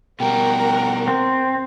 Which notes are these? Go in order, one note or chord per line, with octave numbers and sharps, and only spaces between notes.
B2 G3 A#4 F#5 G5
C4